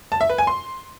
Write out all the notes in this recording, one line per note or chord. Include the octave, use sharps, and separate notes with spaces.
A5
E5
B4
G#5
C6